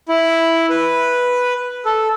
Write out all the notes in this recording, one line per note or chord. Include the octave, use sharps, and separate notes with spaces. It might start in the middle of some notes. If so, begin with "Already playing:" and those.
E4
B4
A4